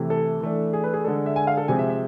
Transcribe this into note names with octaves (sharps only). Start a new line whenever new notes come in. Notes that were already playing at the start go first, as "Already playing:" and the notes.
Already playing: C3 E3 A3
A4
E3 A3 D4
G#4
B4
G#4
D3 G#3 D4 A4
E5
G#5
F5
A4
C3 F3 G#3 C4 G#5
E5
E5